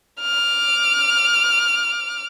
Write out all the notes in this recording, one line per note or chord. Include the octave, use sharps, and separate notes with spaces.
D6 F6